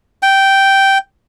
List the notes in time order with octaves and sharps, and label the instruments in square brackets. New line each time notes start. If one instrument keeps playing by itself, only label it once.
[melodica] G5